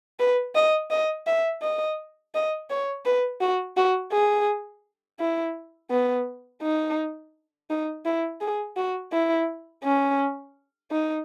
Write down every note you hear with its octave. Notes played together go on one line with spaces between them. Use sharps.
B4
D#5
D#5
E5
D#5
D#5
C#5
B4
F#4
F#4
G#4
E4
B3
D#4
D#4
E4
G#4
F#4
E4
C#4
D#4